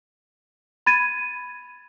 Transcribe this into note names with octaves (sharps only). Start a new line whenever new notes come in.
B5 G#6 A6 D#7